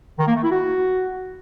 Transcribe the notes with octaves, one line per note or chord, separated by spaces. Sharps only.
D#3
A#3
A3
E4
F#4